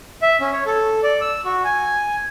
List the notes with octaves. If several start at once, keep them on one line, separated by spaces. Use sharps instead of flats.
E5
C#4
C#5
A4
D5
E6
F#4
G#5